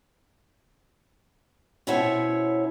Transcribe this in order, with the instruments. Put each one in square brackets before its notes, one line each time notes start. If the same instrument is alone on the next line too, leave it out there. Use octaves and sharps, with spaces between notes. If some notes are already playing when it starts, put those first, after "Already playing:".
[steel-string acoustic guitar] B2 C#4 E4 C5 C#5 F#5